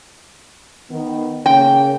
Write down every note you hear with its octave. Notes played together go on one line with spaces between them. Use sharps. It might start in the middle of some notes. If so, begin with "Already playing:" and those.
D#3 B3
C#3 A#3 C#4 G5